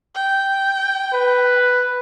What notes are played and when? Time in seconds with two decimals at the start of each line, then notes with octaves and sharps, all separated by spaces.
0.15 G5
1.14 B4